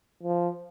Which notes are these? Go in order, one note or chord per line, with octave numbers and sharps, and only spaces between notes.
F3